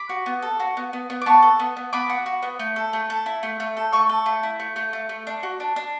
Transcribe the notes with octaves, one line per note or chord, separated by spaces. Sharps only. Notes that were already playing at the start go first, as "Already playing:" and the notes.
Already playing: B5 D6
F#4
B3
A4
F#4
B3
B3
B3
D6
B3 A5 C#6
A4
B3
B3
B3 B5 D6
F#4
F#4
B3
A3
A4
A3
A4
E4
A3
A3
A4
A3 C#6 E6
A4
A3
E4
A3
A3
A3
A3
D4
F#4
D4
D4